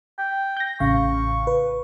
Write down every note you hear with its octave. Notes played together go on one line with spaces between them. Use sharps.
G5
G6 A#6
A1 C#3 F5 C#6
B4